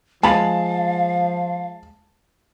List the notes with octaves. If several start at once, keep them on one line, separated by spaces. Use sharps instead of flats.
F3 G#3 F5 A5 B5